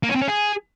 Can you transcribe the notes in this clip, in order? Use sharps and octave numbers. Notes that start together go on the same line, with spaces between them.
A#3
C#4
C4
C#4
G#4